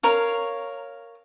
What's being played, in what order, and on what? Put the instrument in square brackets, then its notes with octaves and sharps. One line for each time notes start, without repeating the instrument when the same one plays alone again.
[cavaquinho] A#4 C#5 F5